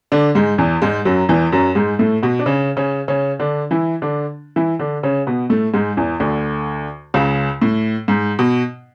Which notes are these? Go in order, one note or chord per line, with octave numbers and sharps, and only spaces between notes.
D3 D4
G#2 G#3
E2 E3
G#2 G#3
F#2 F#3
E2 E3
F#2 F#3
G#2 G#3
A2 A3
B2 B3
D4
C#3 C#4
C#3 C#4
C#3 C#4
D3 D4
E3 E4
D3 D4
E3 E4
D3 D4
C#3 C#4
B2 B3
A2 A3
G#2 G#3
E2 E3
D2 D3
C#2 C#3
A2
G#2
B2